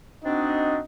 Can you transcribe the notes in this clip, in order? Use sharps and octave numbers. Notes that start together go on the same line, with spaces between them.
C4 D4 D#4 F#4 D#5